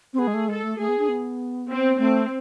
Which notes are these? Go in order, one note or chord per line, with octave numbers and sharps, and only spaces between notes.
C4
B3 G#4
G#3
A3
G#3 A4
A3
A3 G#4
B3
D4
B3
C4
A3 C4